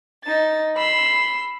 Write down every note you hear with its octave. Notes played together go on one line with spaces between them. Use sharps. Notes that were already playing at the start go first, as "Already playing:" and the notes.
D#4 A6
B5 C6 E6